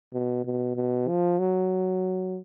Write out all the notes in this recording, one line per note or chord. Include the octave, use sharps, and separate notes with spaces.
B2
B2
B2
F3
F#3